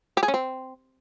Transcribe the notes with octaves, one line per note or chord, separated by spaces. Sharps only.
G4
G#4
C#4
C4